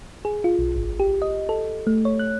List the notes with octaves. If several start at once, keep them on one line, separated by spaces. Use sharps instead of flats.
G#4
F4
B1
G#1
G4
D#5
A4
A3
C#5
F#6